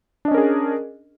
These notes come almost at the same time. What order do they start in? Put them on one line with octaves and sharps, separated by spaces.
D4 D#5 C#4 A#4 G#4